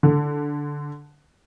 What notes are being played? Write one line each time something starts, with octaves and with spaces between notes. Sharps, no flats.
D3